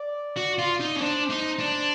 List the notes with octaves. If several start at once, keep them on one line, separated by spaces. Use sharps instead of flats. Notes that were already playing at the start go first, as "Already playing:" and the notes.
Already playing: D5
F#4
F4
D#4
C#4
D4 C5
D#4
D4